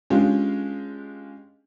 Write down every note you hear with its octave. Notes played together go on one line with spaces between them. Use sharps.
G#3 C#4 D4 F4 G4 G#4